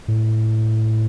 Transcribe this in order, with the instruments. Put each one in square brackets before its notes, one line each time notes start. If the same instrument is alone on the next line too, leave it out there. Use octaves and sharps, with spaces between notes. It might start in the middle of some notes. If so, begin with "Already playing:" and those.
[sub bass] A2